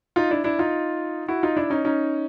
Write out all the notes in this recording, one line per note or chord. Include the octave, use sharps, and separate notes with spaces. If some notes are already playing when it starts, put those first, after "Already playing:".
D#4 F4
D4 E4
D4 E4
D#4 F4
E4 F#4
D#4 F4
D4 E4
C#4 D#4
C#4 D#4